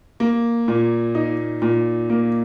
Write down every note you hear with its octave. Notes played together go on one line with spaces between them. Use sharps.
A#3
A#2
D#4
A#2
A#3